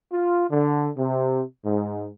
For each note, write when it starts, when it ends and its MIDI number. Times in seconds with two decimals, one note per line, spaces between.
0.12 0.45 65
0.50 0.88 50
0.97 1.43 48
1.65 2.09 44